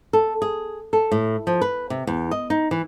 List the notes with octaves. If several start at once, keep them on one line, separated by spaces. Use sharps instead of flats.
A4
G#4
A4
A2
F3
B4
C3
E2
D#5
D#4
E3